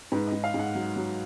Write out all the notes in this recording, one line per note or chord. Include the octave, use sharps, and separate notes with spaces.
G#2 B4
G#2 D#5
F5
G#2
F#5
F#3
F#3